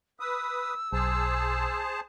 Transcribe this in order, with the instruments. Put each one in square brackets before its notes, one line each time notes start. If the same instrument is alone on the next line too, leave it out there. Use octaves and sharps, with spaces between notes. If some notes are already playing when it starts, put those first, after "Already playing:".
[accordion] B4 D#6 [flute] E6
[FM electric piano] B1 [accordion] G#4 C5 A5